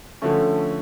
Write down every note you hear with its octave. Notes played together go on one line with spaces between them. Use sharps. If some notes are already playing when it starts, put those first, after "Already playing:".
D3 F3 A3 C#4